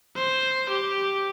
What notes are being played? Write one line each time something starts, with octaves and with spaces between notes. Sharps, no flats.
C5
G4